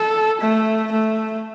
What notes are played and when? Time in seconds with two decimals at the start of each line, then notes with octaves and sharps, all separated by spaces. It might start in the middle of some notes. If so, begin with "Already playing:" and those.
Already playing: A4
0.41 A3
0.91 A3